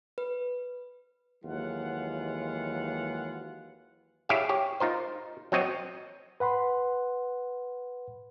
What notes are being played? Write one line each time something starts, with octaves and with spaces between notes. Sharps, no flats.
B4
D#2 E3 F#3 G#3 F4 F#5
E4 G4 G#4 C#5 E5 F5
G4 C#5
D#4 F4 A#4 C5
F#3 C4 C#5 D#5
B4 F#5 B5 C6